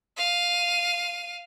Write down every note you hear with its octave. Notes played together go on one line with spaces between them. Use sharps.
F5 D#7